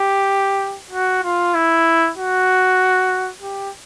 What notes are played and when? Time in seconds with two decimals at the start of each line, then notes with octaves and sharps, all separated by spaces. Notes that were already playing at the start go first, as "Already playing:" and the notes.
Already playing: G4
0.91 F#4
1.23 F4
1.55 E4
2.17 F#4
3.41 G4